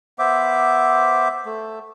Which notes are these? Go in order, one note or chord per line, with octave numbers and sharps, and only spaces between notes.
B3 C5 E5 D6
A3